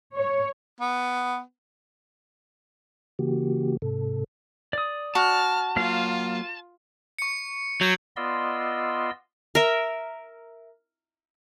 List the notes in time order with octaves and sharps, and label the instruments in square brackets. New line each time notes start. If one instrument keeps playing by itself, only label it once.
[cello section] C#5
[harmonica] B3
[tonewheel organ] C#3 E3 A#3 F#4 G4
G#2 C3 A4
[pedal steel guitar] D5 D#6
[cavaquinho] F#4 [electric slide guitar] A5 [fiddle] F6
[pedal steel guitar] F#3 A#3 F5 [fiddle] F4
[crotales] C#6 C#7
[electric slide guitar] F#3 [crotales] G6 G#6 F#7
[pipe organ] B3 F4 D5 D#5 C6 E6
[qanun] A#4 E5